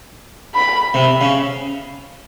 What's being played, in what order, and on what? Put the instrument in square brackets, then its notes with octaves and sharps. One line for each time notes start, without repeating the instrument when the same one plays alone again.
[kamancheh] B5
[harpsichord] C3
C#3